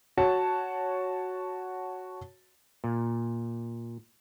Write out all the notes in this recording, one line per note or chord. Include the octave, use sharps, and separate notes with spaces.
F#4 C#5 A5
A#2